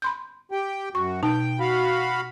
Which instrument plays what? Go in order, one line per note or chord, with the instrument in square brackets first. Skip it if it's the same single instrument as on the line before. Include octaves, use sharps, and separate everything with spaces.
[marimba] B5 C6 G6
[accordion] G4 G5
[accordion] F#2 F#4 [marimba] C#6
[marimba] B2 D#4 A5 [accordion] G5
[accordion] F#4 F5 B5